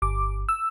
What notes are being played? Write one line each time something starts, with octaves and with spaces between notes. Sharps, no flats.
G1 D6
E6